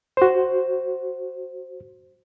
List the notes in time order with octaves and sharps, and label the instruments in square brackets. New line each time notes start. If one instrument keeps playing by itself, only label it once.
[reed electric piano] F#4 C5